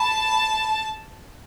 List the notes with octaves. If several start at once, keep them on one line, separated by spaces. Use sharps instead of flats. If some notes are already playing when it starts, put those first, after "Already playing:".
Already playing: A5 B5